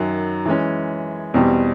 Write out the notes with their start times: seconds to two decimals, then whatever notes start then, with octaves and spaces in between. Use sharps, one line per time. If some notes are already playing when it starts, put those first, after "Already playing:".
Already playing: F#2 D#3 F#3
0.45 E3 G#3 C#4
1.34 E2 B2 G3 C4